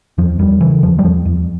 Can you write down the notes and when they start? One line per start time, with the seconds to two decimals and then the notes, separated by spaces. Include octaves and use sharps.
0.18 E2 F3
0.39 E2 G3
0.61 C#3 E3
0.83 E2 F3
0.99 G3
1.04 E2 F3
1.26 E2